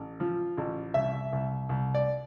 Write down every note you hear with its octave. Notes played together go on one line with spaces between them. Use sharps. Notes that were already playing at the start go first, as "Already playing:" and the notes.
Already playing: A1
F3
A1
C2 E5
C2
C2
D5